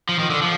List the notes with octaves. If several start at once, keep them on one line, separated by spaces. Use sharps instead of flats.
F3
D#3
D3
F3